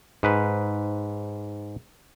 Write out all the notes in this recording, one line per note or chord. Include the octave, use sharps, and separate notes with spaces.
G#2 B4